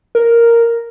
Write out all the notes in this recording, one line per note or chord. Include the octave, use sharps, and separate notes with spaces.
A#4